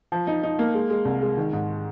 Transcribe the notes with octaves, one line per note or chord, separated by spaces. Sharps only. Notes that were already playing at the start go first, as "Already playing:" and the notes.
F3
D#4
D#4
A#3
G#3
G#3
C2
G#3
D#3
G#2